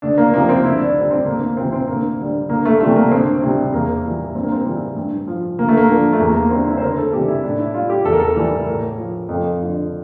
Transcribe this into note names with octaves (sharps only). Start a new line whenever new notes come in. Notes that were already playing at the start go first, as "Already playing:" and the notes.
D2 D4
A#3
C3 F3 A#3
C4
D2 E4
D4
D3 G3
C4
D2 A#3
A#3
C3 E3 C4
C4
D2 A#3
D3 G3
D2 A#3
A3
C3 E3 G3 A3
A#3
D2 C4
C3 G3
E2 A#3
E3 G3
G2 C4
A#3
C4
E3 G3
G2
F3
D2 A#3
A3
A#3
D3 F3
A3
E2 A#3
A#3
D3 G3 C4
E4
C5
D2 A#4
A4
C3 E3 G3 G4
E4
A2 D4
E4
G3 F4
G4
E2 A4
A#4
A4
E3 G3
A2 A#4
F3
F2
D3 F3